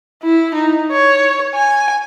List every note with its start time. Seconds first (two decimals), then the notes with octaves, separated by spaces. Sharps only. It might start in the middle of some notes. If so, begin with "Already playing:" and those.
0.23 E4
0.54 D#4
0.92 C#5
1.55 G#5